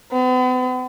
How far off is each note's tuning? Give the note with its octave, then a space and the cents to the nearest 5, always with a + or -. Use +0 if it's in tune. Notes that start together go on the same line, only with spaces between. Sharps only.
B3 +45